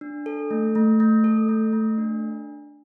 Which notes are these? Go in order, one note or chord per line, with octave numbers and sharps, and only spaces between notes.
D4
A4
A3
A3
A3
A4
A3
A3
D4